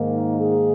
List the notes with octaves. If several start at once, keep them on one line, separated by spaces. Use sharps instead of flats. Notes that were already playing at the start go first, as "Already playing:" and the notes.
Already playing: G#2 D#3 A#3
G#4